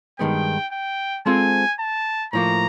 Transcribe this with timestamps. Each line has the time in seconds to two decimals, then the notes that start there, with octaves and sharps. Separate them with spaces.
0.19 G2 D#3 G#3 B3 G5
0.72 G5
1.26 G#3 C4 F4 A4 C5 G#5
1.80 A5
2.33 A2 F3 A#3 A#5